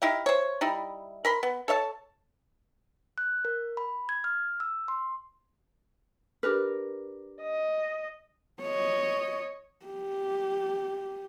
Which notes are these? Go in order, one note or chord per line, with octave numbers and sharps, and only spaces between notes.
D#4 E4 G4 F5
C5 C#5
G3 D#4 E4
A#4 B5 C6
B3
A4 C#5 E5 A5
F#6
A#4
B5
G#6
F6
E6
C6
D4 G4 A#4 B4 F6
D#5
C#5 D#5
G4